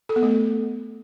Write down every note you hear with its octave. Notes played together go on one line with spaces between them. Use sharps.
A4
B3
A3